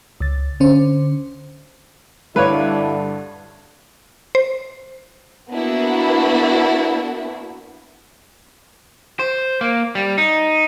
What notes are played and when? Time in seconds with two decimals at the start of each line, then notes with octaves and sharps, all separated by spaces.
0.21 C#2 A6
0.60 D3 C#4 C5
2.36 G2 D3 D4 E4 B4 C#5 F5 D6
4.35 C5
5.52 A#3 B3 D4 E4 F#4
9.19 C5
9.61 A#3
9.95 G3
10.18 D#4